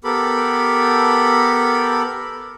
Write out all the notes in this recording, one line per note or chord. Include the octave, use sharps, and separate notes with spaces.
B3 G4 A4 A#4 B5